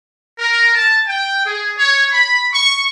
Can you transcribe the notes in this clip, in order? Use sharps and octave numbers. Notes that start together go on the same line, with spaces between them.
A#4
A5
G5
G#4
C#5
B5
C#6